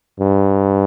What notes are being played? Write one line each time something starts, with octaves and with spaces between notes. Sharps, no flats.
G2